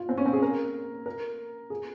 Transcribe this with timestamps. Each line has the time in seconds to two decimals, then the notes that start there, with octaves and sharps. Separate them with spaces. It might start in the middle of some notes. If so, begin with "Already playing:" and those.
Already playing: F4
0.09 C4
0.18 C#4
0.26 C4
0.33 G#4
0.42 A#4
1.06 A#4
1.70 G#4